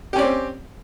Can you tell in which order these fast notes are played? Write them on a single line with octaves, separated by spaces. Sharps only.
G4 C#4 D5 C4